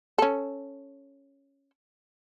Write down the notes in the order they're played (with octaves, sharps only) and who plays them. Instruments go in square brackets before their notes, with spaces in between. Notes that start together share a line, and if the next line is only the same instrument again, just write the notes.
[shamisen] C#4 A4